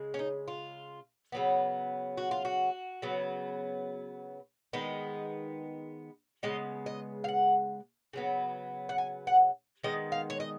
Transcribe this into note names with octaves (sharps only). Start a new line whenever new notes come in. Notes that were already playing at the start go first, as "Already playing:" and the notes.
Already playing: C#3 G#3
C#4
D#4
F4
C#3 F#3 B3
F#4
F4
F#4
C#3 F#3 B3
D#3 G#3 B3 D#5
C#3 G#3 B3 D#5
D#5
F5
F#5
C#3 F#3 B3
F#5
G#5
F#5
D#3 G#3 B3 D#5
F5
C#5
D#5